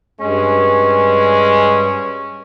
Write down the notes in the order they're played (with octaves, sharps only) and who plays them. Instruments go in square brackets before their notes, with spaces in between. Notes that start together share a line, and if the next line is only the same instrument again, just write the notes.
[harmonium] G2 [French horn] G#3 [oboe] C#4